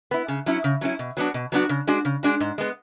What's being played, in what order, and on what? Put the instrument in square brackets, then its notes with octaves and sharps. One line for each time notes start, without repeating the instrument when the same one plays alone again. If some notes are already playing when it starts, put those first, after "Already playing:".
[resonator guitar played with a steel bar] B3 E4
C#3
F#3 C#4 E4
C#3
F#3 C#4 E4
B2
F#3 B3 D4 F#4
B2
F#3 B3 D4 F#4
C#3
G#3 D4 F#4
C#3
G#3 D4 F#4
G#2
G#3 B3